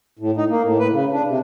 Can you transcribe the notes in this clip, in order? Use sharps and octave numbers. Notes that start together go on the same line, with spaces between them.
A2
D#4
A#3
A2
B4
C#3
D4
C3